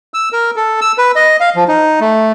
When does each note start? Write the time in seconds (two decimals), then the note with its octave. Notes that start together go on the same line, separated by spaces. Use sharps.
0.14 E6
0.33 A#4
0.56 A4
0.81 E6
0.98 B4
1.16 D#5
1.40 F5
1.56 F3
1.68 D#4
2.01 A3